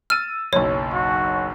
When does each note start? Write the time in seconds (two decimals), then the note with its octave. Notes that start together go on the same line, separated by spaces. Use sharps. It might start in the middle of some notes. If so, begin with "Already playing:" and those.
0.10 E6 F6 A6 D#7
0.53 F#1 B1 C#5
0.94 F#4